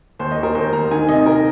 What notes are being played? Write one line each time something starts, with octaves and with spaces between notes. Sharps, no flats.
D#2 C5
D#5
D#2
A#4
D#2 C5
D#2 A#5
D#3 G#5
C3 D#5
A#4